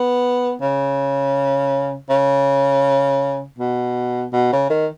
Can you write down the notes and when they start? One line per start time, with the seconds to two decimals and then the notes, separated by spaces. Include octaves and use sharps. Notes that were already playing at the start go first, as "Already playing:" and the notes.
Already playing: B3
0.61 C#3
2.10 C#3
3.58 B2
4.32 B2
4.52 C#3
4.70 D#3